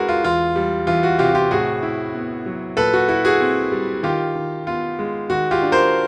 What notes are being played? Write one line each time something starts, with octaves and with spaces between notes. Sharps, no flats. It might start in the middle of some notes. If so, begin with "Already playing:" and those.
Already playing: G#3 C#4 E4 F#4 G#4 A#4 B4
F4
E2 F4
G3
E3 F4
F#4
C3 F4 G4
F4 G4
A2 F#4 G#4
E4
B3
F#3
A#2 A4 B4
F#4
E4 F#4
F#4 G#4
C4
G3
D#3 F4 G4
D#3
B3 F4
G#3
D#3 F#4
F4 G4
D4
A#4 C5